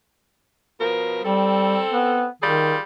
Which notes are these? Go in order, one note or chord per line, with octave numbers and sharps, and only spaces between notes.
B2 F3 A#4
G3 C4 A4
B3
D#3 G3 F4 G#4